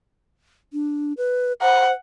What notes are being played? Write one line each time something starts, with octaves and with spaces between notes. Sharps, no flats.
D4
B4
C5 F#5